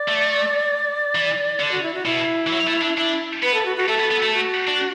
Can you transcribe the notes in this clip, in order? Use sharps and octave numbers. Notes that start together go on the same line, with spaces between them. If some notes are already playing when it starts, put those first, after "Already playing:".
Already playing: D5
A3
E3
D3
F#4
E4
F#4
B2 E4
E3
F#3
A3
D4
D4 E4
B3 B4
A4
F#4
F#4
A3 A4
B3
B3
A3
F#4
D4